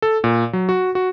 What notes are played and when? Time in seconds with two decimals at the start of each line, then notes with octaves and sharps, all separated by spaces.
0.02 A4
0.24 A#2
0.53 F#3
0.69 F#4
0.95 F#4